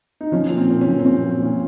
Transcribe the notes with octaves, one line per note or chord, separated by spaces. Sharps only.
D#4
F3 C#4
A#2
C4
A#2
C#4
F3
C4
A#2 C#4
F3
C4
A#2